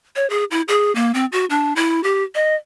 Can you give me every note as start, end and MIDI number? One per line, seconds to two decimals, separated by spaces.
0.16 0.28 73
0.30 0.44 68
0.51 0.61 64
0.68 0.94 68
0.95 1.11 58
1.14 1.26 60
1.32 1.45 66
1.50 1.73 62
1.76 2.02 64
2.04 2.23 67
2.35 2.55 75